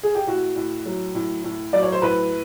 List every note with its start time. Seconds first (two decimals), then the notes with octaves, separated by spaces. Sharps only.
0.03 G#4
0.15 G4
0.27 A2 F#4
0.56 A2
0.86 F#3
1.15 A2
1.44 A2
1.73 F#3 D5
1.83 C#5
1.92 C5
2.02 A2 B4